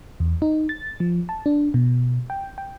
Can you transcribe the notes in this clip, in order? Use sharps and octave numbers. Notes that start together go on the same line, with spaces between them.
E2
D#4
A6
F3
A5
D4
B2
G5
G5